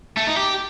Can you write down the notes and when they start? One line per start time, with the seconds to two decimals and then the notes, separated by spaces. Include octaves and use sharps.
0.17 A3
0.27 D#4
0.37 G4